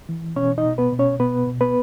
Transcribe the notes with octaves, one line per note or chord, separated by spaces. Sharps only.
E3
B2 C#4 C#5
D#4 D#5
B2
B3 B4
B2
C#4 C#5
B2 B3 B4
B2
B3 B4